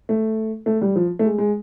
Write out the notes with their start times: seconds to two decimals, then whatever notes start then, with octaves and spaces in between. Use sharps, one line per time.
0.09 A3
0.66 A3
0.81 G3
0.96 F3
1.19 A3
1.25 G#3
1.38 G#3